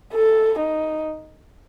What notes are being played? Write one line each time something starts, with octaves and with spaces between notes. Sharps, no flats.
A4
D#4